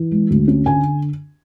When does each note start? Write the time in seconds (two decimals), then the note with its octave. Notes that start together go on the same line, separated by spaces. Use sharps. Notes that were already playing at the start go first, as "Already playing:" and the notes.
Already playing: E3
0.11 G#3
0.30 D2
0.48 C#4
0.66 D3 G#5